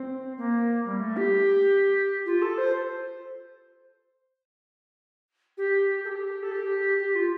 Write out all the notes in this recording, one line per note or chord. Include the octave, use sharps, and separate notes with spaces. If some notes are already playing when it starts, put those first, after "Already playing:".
Already playing: C4
A#3
G3
A3
G4
F4
A4
C5
G4
A4
G4
A4
G4
G4
F4